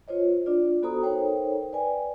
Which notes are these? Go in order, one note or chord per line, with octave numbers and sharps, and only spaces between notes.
F4 C5 C#5 D#5
D4 F4 D5
B3 F#4 A4 C5 A#5 D#6
D#4 A4 A#4 C5 C#5 G5
B4 D5 G5 G#5